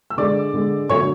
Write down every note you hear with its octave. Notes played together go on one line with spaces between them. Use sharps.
E6
D3 G#3 D5 D6
D3 G#3
D3 F#3 A3 C#5 C#6